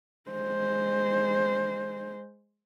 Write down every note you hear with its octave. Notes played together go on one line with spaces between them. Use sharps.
G#3 C5